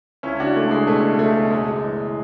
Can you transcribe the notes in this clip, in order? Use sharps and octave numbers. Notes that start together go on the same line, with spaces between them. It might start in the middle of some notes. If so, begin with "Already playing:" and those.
C#2 C#4 E4
D4 F#4
C#2 A3
G#3
B2 A3
C#2 A3
F#2 G#3
E3